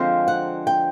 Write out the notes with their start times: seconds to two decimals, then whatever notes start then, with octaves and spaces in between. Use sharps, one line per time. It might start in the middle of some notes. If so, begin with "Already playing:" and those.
Already playing: D3 F3 G#3 C4 F5
0.28 F#5
0.67 G5